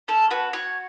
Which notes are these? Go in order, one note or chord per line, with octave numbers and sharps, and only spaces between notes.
C#4 A4
F#4 B4
F#4 C#5